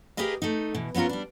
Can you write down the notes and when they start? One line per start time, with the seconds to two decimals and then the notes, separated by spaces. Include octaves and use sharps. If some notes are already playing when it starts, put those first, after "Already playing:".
0.17 G4 G#4 A#4 B4 D#5 F5
0.42 A3 D#4
0.74 B2 E3
0.94 F#3 B3 C#4 F4 A#4
1.09 G3 D4